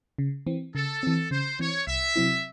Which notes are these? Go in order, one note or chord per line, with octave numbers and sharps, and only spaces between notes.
C#3
E3 C4
C#3 A4
E3 C4
C#3 C5
E3 C4 C#5
C2 E5
C3 F#3 C4 E4